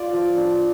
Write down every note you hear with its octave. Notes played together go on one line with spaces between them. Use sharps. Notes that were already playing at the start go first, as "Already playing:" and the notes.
Already playing: F4 D5
F3
D4